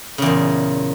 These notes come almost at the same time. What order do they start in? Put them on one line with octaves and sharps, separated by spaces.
C#3 E2 A#2